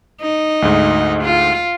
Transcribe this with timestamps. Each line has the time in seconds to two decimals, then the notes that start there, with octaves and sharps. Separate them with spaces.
0.21 D#4
0.62 D2 G#2
1.23 F4